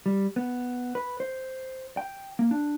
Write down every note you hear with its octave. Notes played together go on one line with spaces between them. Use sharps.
G3
B3
B4
C5
G5
A#3
D4